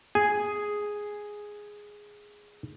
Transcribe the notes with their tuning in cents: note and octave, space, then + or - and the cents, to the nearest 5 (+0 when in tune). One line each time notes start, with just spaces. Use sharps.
G#4 +0 G#5 +0